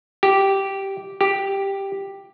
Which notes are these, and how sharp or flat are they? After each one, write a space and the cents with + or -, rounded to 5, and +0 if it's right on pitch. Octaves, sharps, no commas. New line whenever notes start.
G4 -5
G4 +5